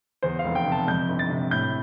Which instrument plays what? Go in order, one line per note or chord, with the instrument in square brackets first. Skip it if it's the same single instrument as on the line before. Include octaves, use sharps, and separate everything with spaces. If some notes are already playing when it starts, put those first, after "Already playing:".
[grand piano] E2 C5
F5
F1
G5
C3
A5
F2 G6
G1
A6
C3
A2 G6